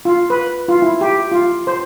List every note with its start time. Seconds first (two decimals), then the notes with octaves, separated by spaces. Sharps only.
0.05 F4
0.30 B4
0.68 F4
0.82 E4
1.01 G4
1.31 F4
1.67 C5